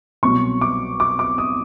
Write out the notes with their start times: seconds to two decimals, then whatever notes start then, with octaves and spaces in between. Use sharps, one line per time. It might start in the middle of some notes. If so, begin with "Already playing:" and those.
0.23 C2 B2 F#3 C#6
0.61 D6
1.00 D6
1.19 D6
1.38 D#6